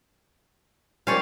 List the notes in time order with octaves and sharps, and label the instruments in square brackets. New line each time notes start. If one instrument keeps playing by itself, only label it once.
[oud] F3 G3 A#3 [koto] C#4 F5